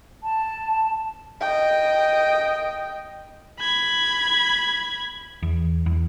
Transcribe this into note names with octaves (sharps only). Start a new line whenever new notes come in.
A5
D#5 G5
B5 G#6
E2
E2